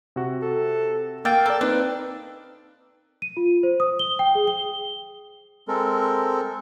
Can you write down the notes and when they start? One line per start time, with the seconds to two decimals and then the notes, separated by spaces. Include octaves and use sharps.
0.16 C3 F#4
0.42 A4
1.25 A#3 G5 E6 F6 A6
1.46 A4 A#4 D5
1.61 C4 D4 D#4 B4
3.22 D#7
3.37 F4
3.63 C5
3.80 D#6
3.99 G7
4.19 G5
4.35 G#4
4.48 G7
5.68 G#3 C4 A4 A#4